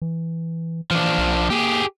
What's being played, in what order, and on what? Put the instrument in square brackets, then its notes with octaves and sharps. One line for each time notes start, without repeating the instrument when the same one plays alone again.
[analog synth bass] E3
[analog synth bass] E3 [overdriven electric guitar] F3 D4
[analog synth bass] B1
[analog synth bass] A#3 [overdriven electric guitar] G4 G#4